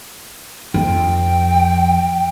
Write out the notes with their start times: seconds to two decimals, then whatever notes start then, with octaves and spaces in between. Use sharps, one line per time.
0.74 F2 G5